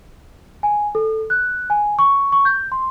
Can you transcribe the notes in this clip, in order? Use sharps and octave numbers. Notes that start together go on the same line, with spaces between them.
G#5
A4
F#6
G#5
C#6
C#6
G6
C6